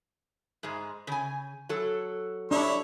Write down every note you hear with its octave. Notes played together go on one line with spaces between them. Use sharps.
G#2 G#3
C#3 G#5
F#3 A4
D4 E4 C#5